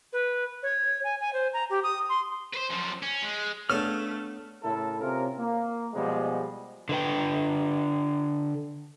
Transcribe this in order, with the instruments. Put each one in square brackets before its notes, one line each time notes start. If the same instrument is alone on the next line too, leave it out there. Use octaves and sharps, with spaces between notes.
[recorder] B4
C#5
G#5
G#5
C5
A#5
G4
D#6
C6
[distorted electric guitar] B4 C5
F#2 F3
C#4
G#3
[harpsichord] C#3 A4 [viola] A3 [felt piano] B3 D4 [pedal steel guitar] F6
[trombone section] A2 C#3 E4 A4 A#4
C3 C#4 F4 A#4
A#3
B2 F3 G3 G#3
[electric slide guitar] D3 B4 G5